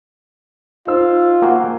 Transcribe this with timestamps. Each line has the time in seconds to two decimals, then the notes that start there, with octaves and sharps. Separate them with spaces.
0.87 D#4 F4 C5 E6
1.42 A#3 F#4 F5 G5 G#5